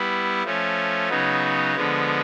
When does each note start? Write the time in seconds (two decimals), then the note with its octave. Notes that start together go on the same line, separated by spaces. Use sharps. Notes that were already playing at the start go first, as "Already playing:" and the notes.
Already playing: G3 B3 E4
0.44 F3 A3 C#4
1.09 C#3 F#3 B3 D#4
1.75 D3 F3 G#3 B3